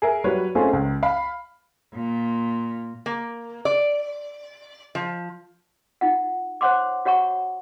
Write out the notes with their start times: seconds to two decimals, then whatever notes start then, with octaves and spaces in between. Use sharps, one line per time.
0.02 G#4 A#4 E5
0.24 F#3 G3 B4 C#5
0.55 A3 C4 C#4 D#4 F4 G#4
0.73 C#2
1.03 F5 B5
1.94 A#2
3.06 A#3
3.65 D5
4.95 F3
6.01 D#4 F4 F#5
6.61 C5 C#5 F#5 C6 D6
7.05 F#4 C#5 F#5 A#5 C#6